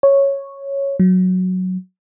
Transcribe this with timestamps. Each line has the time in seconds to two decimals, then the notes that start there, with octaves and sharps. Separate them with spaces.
0.03 C#5
1.00 F#3